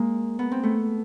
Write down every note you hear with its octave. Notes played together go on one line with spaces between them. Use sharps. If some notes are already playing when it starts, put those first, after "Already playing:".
Already playing: G#3 A#3
B3
C4
A3 B3